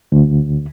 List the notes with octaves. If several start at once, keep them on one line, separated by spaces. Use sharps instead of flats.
D2